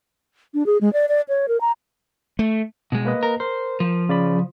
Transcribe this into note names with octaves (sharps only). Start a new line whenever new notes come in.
D4
G#4
G#3
D5
D5
C#5
A#4
A#5
A3
B2 G#3
A#3 B4 D#5
A#4
A#4 C5
F3
C#3 D5 B5